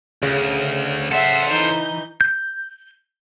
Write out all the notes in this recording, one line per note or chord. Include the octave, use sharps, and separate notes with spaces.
D2 C#3
A4 C5 E5 F#5
E3 D#4 G6
G6